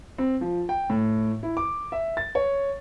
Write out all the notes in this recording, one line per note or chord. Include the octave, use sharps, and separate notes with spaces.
C4
F3
G5
A2
E4
D6
E5
A6
C#5